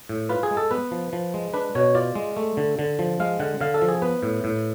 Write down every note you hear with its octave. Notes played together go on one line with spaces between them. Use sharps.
A2
F4 B4
G#4
G#3
A4
B3 B4
F3
F3
G#3
D4 B4
B2 C#5
F4 D5
G#3
A3
D3
D3
F3
G#3 F5
D3 F#5
D3 F5
A4
F3
G#4
B3 B4
A2
A2